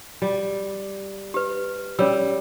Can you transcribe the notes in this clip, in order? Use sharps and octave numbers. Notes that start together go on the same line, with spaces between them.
G3
G4 B4
G3 C#4 C#5 E6